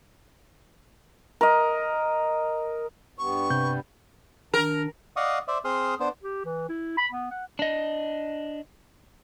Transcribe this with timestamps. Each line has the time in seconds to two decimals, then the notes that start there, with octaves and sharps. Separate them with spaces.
1.41 A#4 D#5
3.19 G2 G3 B3 C#6
3.50 C3 G6
4.54 D#3 D4 A#4
5.16 D5 D#5 F5 F#5 C#6 D#6
5.48 C5 D5 E5
5.65 C4 G#4 C5 C6 D#6 F6
6.00 B3 D4 C5
6.23 G4
6.45 E3
6.69 E4
6.98 B5
7.12 B3
7.31 F#5
7.59 D4 D#5